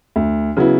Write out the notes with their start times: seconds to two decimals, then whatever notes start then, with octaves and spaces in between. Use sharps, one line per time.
0.16 D2
0.57 C#3 F#3 B3 E4